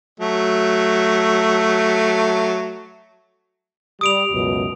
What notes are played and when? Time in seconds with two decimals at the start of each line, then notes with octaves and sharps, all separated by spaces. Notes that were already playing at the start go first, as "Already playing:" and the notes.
0.20 F#3 A3
4.01 G3 D#6 D7 F7
4.31 C#2 F#2 B2